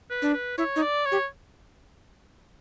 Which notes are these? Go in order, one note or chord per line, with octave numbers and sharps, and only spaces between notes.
B4
D4
B4
E4 C#5
D#4
D5
C#5
G4